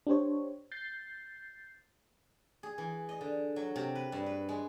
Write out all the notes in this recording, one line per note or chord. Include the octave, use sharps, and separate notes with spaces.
D4 G4 C5 C#5
G6 A6 C7
G#4
E3
D#5
D3
F#3
C3
B4
G2
B4
G#3